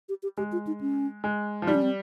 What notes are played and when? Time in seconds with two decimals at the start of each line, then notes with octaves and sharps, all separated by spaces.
0.09 G4
0.23 G4
0.37 G#3 G4
0.52 F4
0.67 D#4
0.81 C#4
1.24 G#3
1.62 F3
1.67 G3 D#4
1.75 C#4
1.82 C4